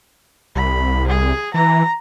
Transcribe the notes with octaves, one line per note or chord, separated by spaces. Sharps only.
C2 B5
G#4
E3 A#5